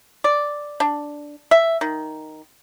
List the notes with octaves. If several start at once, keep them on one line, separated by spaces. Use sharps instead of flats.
D5
D4
E5
D#3